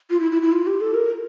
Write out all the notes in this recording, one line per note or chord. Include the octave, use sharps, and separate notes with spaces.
F4
E4
E4
E4
F4
G4
A4
A#4